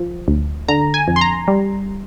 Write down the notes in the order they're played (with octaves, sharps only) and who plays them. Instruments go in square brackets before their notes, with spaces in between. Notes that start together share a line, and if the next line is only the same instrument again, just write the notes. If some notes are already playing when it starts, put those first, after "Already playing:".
Already playing: [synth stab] F3
D2
D3 A#5
G#5
F2
C6
A#5
G3